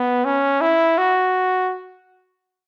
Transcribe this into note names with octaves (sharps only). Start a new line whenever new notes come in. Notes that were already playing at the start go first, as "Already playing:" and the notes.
Already playing: B3
C#4
E4
F#4